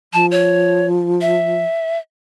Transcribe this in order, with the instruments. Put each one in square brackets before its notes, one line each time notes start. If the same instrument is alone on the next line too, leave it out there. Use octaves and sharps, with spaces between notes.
[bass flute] F3 [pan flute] A5
[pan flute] C#5
E5